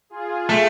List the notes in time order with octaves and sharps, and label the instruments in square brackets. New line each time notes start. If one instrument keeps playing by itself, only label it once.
[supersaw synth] F4 G#4
[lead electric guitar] A3